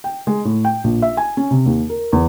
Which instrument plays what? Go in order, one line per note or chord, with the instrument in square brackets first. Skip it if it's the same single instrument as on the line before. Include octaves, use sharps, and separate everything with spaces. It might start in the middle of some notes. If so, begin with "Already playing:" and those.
[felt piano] G5
G#3
A2
G5
A#1
E5
G#5
C#4
C3
D#2
A#4
E2